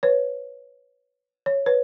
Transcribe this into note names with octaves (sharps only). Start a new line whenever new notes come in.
B4 C#5
C#5
B4 C#5